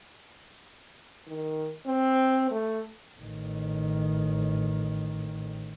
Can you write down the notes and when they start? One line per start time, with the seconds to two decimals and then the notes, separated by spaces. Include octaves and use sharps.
1.27 D#3
1.86 C4
2.51 A3
3.20 A1 D#3